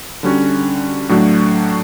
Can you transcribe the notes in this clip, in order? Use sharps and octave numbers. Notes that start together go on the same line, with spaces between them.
D3 G3 C#4 F#4
A2 F#3 A3 D4 F#4